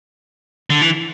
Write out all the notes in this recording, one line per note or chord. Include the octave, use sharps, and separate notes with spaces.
D3
E3